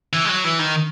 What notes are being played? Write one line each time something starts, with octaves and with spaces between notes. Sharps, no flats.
E3
G#3
F#3
E3
D#3